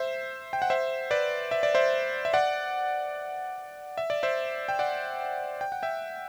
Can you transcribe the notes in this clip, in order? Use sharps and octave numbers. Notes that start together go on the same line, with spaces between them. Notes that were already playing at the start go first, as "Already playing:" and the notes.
Already playing: C5 E5
G5
F#5
C5 E5
B4 D5
E5
D5
C5 E5
E5
D5 F#5
E5
D5
C5 E5
G5
D5 F#5
G5
F#5
E5 G5